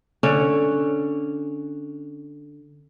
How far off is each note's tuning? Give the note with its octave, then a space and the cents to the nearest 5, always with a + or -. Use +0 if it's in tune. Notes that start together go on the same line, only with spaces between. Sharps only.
D3 +0 C#4 +0 C#5 -5